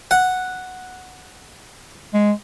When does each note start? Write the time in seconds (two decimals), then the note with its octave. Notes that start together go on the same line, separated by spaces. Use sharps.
0.11 F#5
2.14 G#3